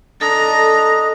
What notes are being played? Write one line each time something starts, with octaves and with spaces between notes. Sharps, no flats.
D4 A4 D#5 A#5